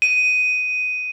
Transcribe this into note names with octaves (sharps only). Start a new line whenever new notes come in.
D#7